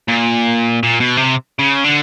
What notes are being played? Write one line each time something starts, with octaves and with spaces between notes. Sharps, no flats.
A#2
A#2
B2
C3
C#3
D3